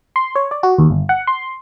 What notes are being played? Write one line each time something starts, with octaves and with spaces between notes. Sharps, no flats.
C6
C#5
D5
F#4
D#2
G1
F#5
C6